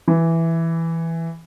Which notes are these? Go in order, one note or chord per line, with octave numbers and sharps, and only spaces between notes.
E3